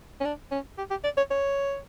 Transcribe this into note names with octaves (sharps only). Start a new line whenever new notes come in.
C#4
D4
C#4
G4
G4
D5
C#5
C#5